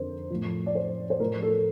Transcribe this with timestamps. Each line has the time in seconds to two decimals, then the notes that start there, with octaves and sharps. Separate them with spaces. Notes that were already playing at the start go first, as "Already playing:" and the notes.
Already playing: F2 D3 F3 A#4 C5
0.30 A2 F3
0.66 D5
0.75 C5
1.10 C5
1.20 A2 F3 A#4
1.42 A4
1.50 A#4